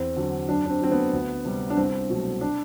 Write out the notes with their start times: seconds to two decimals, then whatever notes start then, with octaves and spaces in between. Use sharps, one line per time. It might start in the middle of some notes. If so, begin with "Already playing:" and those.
Already playing: E2 C4
0.17 D3 F#3
0.48 F#2 D4
0.66 D4
0.70 C4
0.81 F#3 A3 C4
0.92 B3
1.13 D2
1.45 C3 G3
1.70 D4
1.77 C2 C4
2.10 B2 F#3 A3
2.41 D4